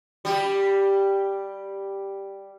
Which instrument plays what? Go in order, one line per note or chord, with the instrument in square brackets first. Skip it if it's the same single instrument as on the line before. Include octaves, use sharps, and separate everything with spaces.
[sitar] G3 G4